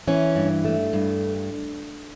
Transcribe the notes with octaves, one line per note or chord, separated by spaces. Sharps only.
E3 C#4
G2
A3
G2